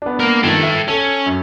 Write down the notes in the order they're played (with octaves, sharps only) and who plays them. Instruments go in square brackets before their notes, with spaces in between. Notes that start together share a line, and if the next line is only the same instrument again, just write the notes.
[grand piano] B3 D4
[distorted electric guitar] A#3 A#4
[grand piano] G2 D#3 F3 [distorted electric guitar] A4 G5
[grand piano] E5
[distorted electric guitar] C#4 [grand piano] A4
[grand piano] F#2